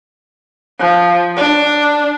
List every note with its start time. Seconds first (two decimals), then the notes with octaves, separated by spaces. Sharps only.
0.80 F3
1.37 D4